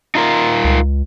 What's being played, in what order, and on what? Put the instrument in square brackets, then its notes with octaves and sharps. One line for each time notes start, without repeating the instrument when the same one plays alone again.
[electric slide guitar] D#4 F4 A#4
[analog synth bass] C#2